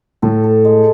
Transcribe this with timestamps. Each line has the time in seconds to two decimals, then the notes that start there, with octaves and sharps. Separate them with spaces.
0.22 A2 A4
0.44 A4
0.65 G#3